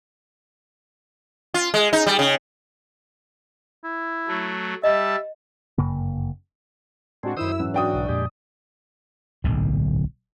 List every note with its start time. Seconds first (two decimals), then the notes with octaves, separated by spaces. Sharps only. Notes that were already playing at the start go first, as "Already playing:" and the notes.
1.54 F4
1.74 G#3
1.93 D#4
2.07 G3
2.19 C#3
3.84 E4
4.28 F#3 A3
4.84 G3 D#5 E5 A5
5.78 G1 F#2 C#3 A#3
7.23 A2 G#3 C4 D4 F#4
7.37 F#2 D#3 E4 C5 D#6 E6
7.60 G#2 E3 F#3 C#4
7.74 D4 F#4 G5 D#6
7.93 B1
8.09 F2 A#2 G#3 G4
9.44 D1 B1 G#2 D3